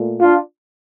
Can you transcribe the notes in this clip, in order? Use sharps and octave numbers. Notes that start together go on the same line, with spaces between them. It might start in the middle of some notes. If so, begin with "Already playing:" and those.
Already playing: A#2 A3
D4 F4